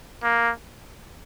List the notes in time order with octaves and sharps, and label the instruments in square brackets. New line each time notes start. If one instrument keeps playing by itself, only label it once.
[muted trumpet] A#3